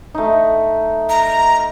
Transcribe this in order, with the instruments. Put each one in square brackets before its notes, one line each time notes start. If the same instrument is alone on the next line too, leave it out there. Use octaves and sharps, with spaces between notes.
[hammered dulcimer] A3 D#4
[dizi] A#5